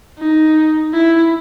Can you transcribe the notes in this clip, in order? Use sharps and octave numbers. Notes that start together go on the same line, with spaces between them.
D#4
E4